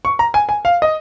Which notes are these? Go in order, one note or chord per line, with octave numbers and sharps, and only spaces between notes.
C#6
A#5
G#5
G#5
F5
D#5